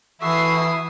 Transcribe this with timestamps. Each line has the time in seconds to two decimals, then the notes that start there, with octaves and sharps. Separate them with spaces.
0.21 E3 E4 F#4 A4 E5 D#6 C7